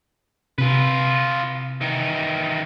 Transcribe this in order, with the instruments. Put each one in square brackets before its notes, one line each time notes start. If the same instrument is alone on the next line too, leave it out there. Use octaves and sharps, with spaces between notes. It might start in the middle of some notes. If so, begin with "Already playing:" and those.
[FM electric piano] C3 [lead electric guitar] F4 B4
[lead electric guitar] D#3 E3